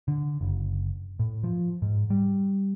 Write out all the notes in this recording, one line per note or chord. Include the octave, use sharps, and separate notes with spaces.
D3
F#1
A2
F3
G#2
G3